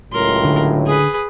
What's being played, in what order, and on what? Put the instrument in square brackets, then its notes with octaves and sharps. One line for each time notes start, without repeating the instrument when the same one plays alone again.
[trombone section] C#2 A2 F#3 [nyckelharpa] A#4 C6
[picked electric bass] D3
[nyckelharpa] G#4 B4